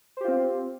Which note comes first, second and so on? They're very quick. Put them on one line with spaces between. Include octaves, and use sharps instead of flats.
C5 G4 F4 C4